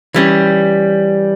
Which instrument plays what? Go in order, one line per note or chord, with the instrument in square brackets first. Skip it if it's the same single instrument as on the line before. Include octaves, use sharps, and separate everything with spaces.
[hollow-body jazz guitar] E3 G3 C#4